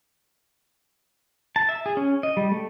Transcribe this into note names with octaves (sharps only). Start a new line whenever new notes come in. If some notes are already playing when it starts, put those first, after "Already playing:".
A5
E5
G#4
C#4
D#5
G3
A3